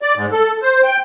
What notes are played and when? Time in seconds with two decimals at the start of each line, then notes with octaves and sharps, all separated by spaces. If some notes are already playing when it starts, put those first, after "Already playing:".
0.02 D5
0.16 G#2
0.32 A4
0.62 C5
0.84 G5